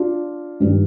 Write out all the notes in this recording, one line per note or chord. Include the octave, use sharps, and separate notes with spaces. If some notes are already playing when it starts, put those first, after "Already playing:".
Already playing: D4 F4
G2 D#3 G3